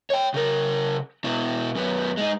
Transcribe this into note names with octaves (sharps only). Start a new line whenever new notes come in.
C#5 G5
C#3 A#4
B2 E4
F#2 B3
G#3 D#4